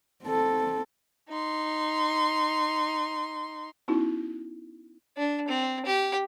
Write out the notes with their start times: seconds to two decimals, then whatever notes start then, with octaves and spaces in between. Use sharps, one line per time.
0.23 C4 A4
1.29 D#4 C6
3.88 B3 C#4 D#4 E4 F#4
5.17 D4
5.48 C4
5.85 G4